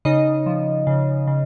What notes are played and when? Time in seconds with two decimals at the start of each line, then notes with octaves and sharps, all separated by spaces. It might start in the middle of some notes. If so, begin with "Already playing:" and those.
0.05 C#3 D#4 D#5
0.46 F3
0.87 C#3
1.27 C#3